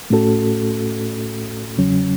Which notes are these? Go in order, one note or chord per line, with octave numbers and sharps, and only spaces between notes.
A2 A3 C#4 F#4 A4
E2 C#3 F#3 C#4